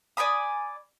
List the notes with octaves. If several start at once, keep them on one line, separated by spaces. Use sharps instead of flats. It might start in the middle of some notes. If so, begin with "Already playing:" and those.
D5 G#5 B5 D#6